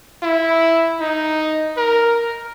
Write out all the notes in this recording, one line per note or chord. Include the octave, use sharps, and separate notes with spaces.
E4
D#4
A#4